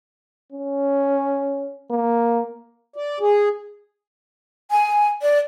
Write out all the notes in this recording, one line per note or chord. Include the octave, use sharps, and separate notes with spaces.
C#4
A#3
D5
G#4
G#5
D5